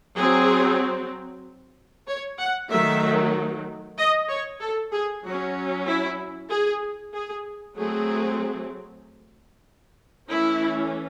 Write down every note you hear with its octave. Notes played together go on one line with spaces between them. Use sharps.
F#3 C4 G#4
C#5
F#5
D#3 F#3 A3 E5
D#5
C#5
A4
G#4
F#3 C#4 F#4
E4
G#4
G#4
F#3 A3 C4 G#4
E3 A3 C#4 E4